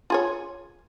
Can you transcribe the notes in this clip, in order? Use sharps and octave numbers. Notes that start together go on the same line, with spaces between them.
F4 G#4 C#5